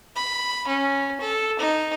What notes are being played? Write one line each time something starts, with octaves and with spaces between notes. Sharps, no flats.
B5
C#4
A4
D#4